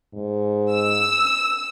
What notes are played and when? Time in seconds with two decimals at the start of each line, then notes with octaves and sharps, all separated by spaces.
0.14 G#2
0.72 E6